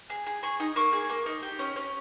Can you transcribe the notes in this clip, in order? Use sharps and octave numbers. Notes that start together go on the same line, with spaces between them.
G#4
G#4
G#4 C#6
D#4 D#6
A#3 C#6
G#4
A#3
D#4
G4
C#4
C#4